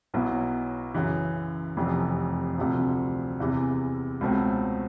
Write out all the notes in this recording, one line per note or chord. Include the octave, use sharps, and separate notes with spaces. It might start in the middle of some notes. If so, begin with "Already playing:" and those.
B1 B2 F#3 B3 E4
F#2 C#3 E3
F1 F2 C3 E3
D2 C3 F3
E2 C3 E3
C#2 B2 F#3 A3 C4